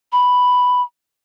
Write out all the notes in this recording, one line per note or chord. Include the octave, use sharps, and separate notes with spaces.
B5